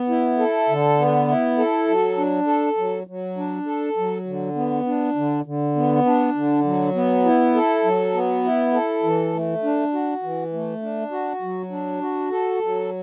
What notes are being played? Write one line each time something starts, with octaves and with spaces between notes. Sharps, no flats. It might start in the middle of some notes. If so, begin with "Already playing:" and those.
Already playing: B3
E4
A4
D3
B3
E4
A4
F#3
D4
A4
F#3
F#3
D4
A4
F#3
D3
B3
D4
D3
D3
B3
D4
D3
F#3
B3
E4
A4
F#3
B3
E4
A4
E3
A3
D4
F#4
E3
A3
D4
F#4
F#3
D4
F#4
A4
F#3